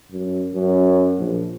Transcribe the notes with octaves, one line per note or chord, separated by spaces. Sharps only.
F#2
F#2
A#1